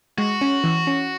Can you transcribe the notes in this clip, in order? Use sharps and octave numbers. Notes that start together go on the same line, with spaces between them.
G#3 F#4
C#4
E3
C#4